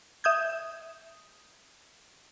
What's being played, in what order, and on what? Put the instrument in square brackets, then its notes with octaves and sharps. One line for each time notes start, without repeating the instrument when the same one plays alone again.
[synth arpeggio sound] E5 D#6 G6 G#6